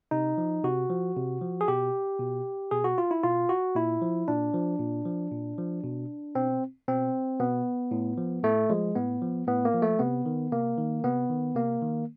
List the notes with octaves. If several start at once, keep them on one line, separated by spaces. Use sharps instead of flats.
C3 D#4
F3
C3 F#4
F3
C3
F3
G#4
B2 G4
B2
B2 G#4
F#4
F4
E4
B2 F4
F#4
A#2 E4
F3
A#2 D4
F3
A#2
F3
A#2
F3
B2
B2 C4
B2 C4
B2 B3
A2
F3
A2 A3
F3 G#3
A2 B3
F3
A2 B3
A#3
F3
A3
C3 B3
D#3
C3 A#3
D#3
C3 B3
D#3
C3 A#3
D#3